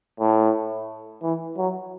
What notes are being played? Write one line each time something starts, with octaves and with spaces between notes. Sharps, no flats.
A2
E3
F#3